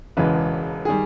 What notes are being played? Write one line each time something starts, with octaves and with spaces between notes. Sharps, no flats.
E1 E2 C#3 E3 G#3 B4
D#3 G3 G#4